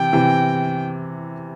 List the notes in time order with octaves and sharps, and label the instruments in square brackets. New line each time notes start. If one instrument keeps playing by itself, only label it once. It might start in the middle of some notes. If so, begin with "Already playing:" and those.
Already playing: [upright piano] C3 E3 [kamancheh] G5
[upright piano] C3 E3